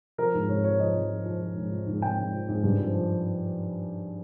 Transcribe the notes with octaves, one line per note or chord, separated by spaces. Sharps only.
F3 A#4
G#2
G#2 C#5
F3 C#5
F3 D#5
F3
F3
F3
F3
G#2
F3
G#2
G#2 G5
G#2
F3
G#2
G2
F3
F3